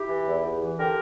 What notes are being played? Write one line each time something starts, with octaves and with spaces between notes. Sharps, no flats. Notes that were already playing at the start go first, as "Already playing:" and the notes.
Already playing: E4 G4
E3
E2
E2
E3
D3 G4 A#4